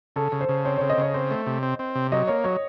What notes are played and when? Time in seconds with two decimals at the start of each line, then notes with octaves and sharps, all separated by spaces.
0.16 C#3 A4
0.32 C#3
0.41 C5
0.49 C#3
0.65 C4 C#5
0.78 C#5
0.81 C#3
0.90 D#5
0.98 C#3 C#5
1.14 C4 C5
1.31 A3
1.46 C3
1.63 C4
1.79 C4
1.95 C3
2.12 F#3 D#5
2.28 A#3 C#5
2.44 F#3 C#5